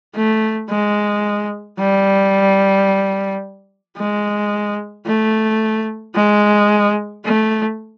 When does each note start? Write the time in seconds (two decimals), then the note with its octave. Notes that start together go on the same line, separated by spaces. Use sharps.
0.15 A3
0.69 G#3
1.79 G3
3.97 G#3
5.06 A3
6.15 G#3
7.25 A3